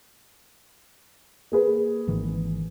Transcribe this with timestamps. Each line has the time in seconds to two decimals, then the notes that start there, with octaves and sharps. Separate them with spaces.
1.52 A#3 G#4 B4
2.08 G#1 D#3 E3